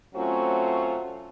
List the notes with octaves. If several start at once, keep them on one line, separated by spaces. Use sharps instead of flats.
F#3 A3 C4 C#4 F4 F#4